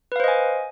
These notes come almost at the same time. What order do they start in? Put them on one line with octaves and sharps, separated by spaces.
B4 F5 C5 D#5 G#5